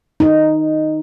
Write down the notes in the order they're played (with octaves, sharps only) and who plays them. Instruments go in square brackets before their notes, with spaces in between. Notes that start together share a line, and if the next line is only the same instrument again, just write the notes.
[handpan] D#4